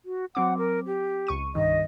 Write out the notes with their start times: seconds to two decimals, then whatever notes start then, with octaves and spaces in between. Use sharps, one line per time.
0.05 F#4
0.35 F#3 C4 F#5 D6
0.58 A#4
0.87 G4
1.27 C#2 C#6 D#7
1.55 C2 G2 D#3 D#5